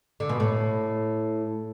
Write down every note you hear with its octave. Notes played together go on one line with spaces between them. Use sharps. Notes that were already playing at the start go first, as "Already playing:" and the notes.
D3
B2
A2